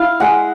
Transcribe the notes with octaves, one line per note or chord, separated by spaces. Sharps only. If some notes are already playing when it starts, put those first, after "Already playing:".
Already playing: E4 F5
G#3 F#5